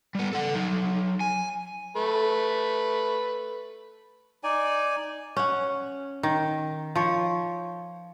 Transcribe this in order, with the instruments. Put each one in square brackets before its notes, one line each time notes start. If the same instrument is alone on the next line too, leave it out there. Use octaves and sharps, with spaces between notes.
[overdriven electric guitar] G3 B3
A4 F#5
F#3 D#4
G#5
[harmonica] A3 B4
[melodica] D#4 D5 G#5
[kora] C#4 F#5
D#3
F3 C#5